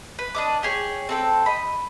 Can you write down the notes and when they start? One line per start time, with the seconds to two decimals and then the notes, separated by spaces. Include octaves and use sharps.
0.19 B4
0.35 D4 D#5 D6
0.63 G4 G#4 C#5
1.09 C4 A4 G5
1.46 D#5 B5